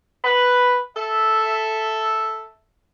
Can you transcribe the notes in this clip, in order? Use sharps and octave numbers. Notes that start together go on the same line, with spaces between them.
B4
A4 E5